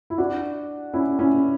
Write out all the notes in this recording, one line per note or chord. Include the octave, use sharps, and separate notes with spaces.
E4
D4 F#4
C#4 E4
C#4 E4